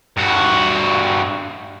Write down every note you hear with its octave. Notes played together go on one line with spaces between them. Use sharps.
G2 F#4